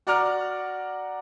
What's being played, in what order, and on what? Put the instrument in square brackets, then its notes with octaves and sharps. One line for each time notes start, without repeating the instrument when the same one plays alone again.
[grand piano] F#4 D5 F#5 A#5 D6 F6